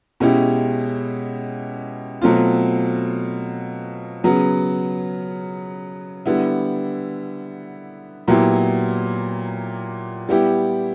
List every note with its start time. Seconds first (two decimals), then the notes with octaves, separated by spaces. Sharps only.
0.20 B2 G#3 C#4 E4 G4
2.22 B2 F#3 A3 C4 F4
4.24 C#3 F#3 B3
6.26 D3 G3 B3 E4
8.28 A#2 F#3 B3 E4 G4
10.29 G3 B3 E4 G4